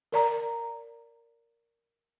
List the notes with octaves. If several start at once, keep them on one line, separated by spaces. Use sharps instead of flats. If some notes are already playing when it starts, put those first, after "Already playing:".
A#4 D5 A#5